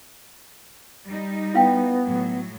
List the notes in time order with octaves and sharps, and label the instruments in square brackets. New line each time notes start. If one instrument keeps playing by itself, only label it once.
[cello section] G3 D#4
[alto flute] B3 [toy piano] E4 F5 G5
[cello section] A2 F#3